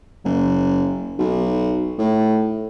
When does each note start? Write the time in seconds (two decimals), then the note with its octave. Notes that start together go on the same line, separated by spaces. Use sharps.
0.25 F#1
1.18 B1
1.98 A2